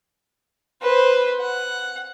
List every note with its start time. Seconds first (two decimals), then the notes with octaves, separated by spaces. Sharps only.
0.82 B4 C5
1.41 F#5